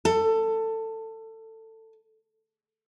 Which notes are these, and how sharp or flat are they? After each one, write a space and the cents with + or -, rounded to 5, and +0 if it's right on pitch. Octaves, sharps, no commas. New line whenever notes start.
A4 +20